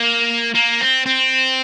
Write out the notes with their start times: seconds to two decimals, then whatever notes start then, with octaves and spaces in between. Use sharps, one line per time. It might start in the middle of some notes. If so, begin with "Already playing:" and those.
Already playing: A#3
0.55 A#3
0.81 C4
1.06 C4